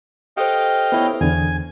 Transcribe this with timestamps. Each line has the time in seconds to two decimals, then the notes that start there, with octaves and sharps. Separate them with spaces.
0.37 G4 A4 C5 D#5 F5 G5
0.92 B3 E4 C#5
1.21 E2 D3 G#5